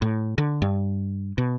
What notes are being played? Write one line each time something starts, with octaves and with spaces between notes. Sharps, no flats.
A2
D3
G2
B2